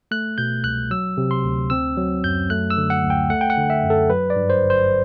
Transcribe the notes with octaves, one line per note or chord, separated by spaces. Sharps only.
A3 F#6
B2 G6
C2 F#6
F#3 E6
C3
C6
D2
C4 E6
F#3
F#2 G6
A3 F#6
E6
D3
F#5
D2
G5
A3 F#5
G5
F#5
D3
E5
F#2
A4
F#3 B4
D5
G2
C5
G1
C5